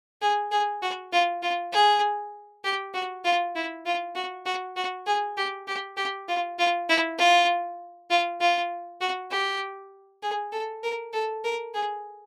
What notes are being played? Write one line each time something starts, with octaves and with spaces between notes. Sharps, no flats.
G#4
G#4
F#4
F4
F4
G#4
G4
F#4
F4
E4
F4
F#4
F#4
F#4
G#4
G4
G4
G4
F4
F4
E4
F4
F4
F4
F#4
G4
G#4
A4
A#4
A4
A#4
G#4